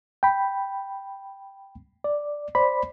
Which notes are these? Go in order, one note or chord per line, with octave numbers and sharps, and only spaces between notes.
G5 B5
D5
C5 D5 B5